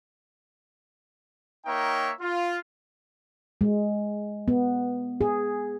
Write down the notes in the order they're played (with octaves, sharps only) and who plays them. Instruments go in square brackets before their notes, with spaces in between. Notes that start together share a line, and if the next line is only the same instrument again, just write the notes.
[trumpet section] A#3 D#4 A#4 C#5 E5 G5
F4
[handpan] G#3
B3
G#4